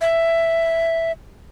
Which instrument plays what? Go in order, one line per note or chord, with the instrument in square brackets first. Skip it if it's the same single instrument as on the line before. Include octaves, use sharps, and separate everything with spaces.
[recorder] E5